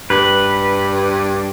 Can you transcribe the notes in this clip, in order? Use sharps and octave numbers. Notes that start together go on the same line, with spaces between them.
G2 B4